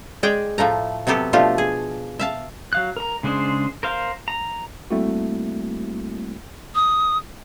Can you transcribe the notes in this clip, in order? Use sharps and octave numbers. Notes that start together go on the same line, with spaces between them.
G#3 G#4 D5 G5
A2 F3 A3 A#5
C3 F#3 B3 G4 A4
B2 F3 A3 D4 F4 G4
G#4
E5 F5 A5
F#3 F5 F#6
A#4 A#5
C#3 G#3 D4 G#4 C5
A#4 C5 F5
A#5
G3 A3 A#3 C4 E4 F#4
D#6